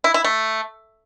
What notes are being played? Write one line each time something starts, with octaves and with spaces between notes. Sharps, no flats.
E4
E4
A3